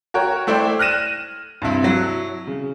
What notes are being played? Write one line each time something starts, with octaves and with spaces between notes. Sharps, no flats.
F#4 A#4 C#5 G5
A3 E4 C5 D5 G5
F6 F#6 A#6 D#7 E7
G2 C3 E4
F#3 E4
C#3